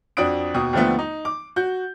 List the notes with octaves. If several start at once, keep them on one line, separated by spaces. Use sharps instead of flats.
F2 D4 F#4 D#6 D7
D#2 B2 D#6
D#2 D3 F3 A3 B3
D#4
D6
F#4 G6